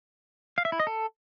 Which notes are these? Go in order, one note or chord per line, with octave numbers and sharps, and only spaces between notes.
F5
E5
E4
D#5
A4